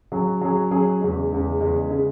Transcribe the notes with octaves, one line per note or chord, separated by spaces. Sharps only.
F#3 C#4 G#4
F#3 C#4 G#4
F#3 C#4 G#4
E2 C#3 G#3
E2 C#3 G#3
E2 C#3 G#3
C#3 G#3